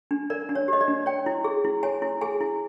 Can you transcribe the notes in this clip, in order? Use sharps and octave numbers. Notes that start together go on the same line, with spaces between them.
D4
A#4 D5
D4
C#5
G4 D#5
D5
D4
C#5 G5
E4
G#4
E4
C#5 G#5
E4
G#4 G#5
E4